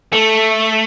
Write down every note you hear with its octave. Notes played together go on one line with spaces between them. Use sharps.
A3